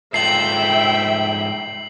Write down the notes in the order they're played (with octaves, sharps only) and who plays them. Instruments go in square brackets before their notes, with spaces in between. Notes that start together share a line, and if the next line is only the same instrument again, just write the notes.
[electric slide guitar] G#2 F4 A4 [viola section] E5 G5 [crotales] C7 F#7